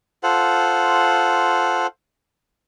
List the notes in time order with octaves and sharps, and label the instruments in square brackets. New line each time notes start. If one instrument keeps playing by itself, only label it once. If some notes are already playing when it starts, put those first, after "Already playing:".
[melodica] F4 A4 C5 F#5